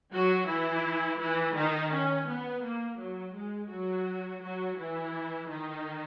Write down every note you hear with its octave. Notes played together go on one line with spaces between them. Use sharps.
F#3 F#4
E3 E4
E3 E4
D#3 D#4
C#4
B3
A#3
F#3
G#3
F#3 F#4
F#3 F#4
E3 E4
D#3 D#4